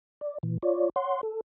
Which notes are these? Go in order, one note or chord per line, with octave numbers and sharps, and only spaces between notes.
D5
A#2 E3
F4 C#5 D5
C#5 F#5 C6
A4